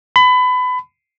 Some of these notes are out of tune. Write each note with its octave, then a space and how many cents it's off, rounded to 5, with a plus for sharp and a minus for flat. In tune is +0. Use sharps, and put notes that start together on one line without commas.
B5 +25